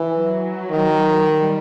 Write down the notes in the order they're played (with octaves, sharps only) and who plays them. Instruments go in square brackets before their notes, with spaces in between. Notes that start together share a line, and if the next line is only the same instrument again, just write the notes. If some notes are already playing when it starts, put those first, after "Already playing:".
Already playing: [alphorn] E3
[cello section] F#3
[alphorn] D#3
[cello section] G3